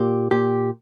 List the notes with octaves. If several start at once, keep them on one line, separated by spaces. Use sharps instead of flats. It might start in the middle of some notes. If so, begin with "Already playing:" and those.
Already playing: A#2 G4
A#2 G4